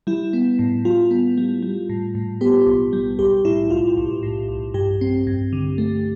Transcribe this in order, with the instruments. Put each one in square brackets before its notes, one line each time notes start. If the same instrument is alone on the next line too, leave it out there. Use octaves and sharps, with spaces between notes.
[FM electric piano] G3 E4
B3
A2
G3 F4
B3
G3
G3
A2
A2
B3 G4
B1
G3
B1 G4
A2 E4
B1 F4
B1
A2
B1
G2 G4
C4
G2
D3
A3